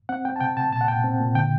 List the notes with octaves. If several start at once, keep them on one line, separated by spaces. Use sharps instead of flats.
C4 F#5
C4 G5
A5
C3 G5
C3 A5
A#2 A5
F#5
A#2 G5
C4
A#2
D3 G5